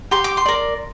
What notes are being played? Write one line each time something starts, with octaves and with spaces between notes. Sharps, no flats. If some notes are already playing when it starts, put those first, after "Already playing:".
G4 C6
D6
C6
A#4 D5